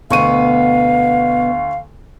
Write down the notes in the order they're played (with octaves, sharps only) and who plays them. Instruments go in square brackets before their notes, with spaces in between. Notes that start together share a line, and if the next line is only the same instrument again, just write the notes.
[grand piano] D2 C#6 D#7 [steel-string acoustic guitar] B2 B3 [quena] F5